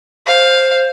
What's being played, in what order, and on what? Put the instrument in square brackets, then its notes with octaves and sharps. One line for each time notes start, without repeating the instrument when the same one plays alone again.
[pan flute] C5 [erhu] F5